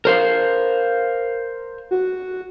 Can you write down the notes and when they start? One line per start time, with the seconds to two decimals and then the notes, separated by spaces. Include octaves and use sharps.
0.05 A#4 C5 F5
1.91 F#4